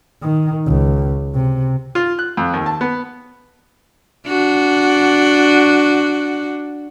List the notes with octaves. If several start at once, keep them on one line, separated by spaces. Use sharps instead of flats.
D#3
C#2
C3
F4
F#6
F2
D#2
A5
B3
D4 F#4